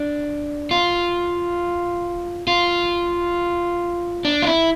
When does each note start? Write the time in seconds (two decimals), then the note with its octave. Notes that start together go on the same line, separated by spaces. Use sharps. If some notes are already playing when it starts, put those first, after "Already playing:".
Already playing: D4
0.71 F4
2.47 F4
4.25 D4
4.42 F4
4.47 E4